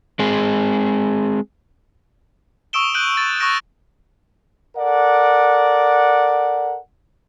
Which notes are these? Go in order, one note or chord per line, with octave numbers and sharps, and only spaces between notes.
G#3 C4 G#4
C#6 D#6 E6 D7 E7 G7
F#6 G6 D7 D#7 F#7
A6
C#6 D#6 F#6 A#6 D7 E7
A4 A#4 D5 F#5